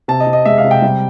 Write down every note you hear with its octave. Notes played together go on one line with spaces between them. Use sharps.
C3 A5
D#5
C3
D#5
G#3 E5
F5
C3
G5
G3